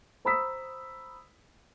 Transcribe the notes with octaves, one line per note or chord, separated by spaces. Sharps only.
C5 A#5 B5 D#6 E6 B6